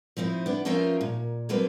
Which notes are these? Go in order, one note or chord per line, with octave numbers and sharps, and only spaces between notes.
F3 C4 D#4 E4
B3 D4
F3 C#4 D#4 F4 A#4 E5
A#2
D3 F#3 A#3 C4 B4